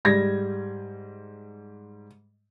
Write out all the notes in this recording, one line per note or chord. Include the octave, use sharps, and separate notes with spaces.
G#2 G3 G#6 A#6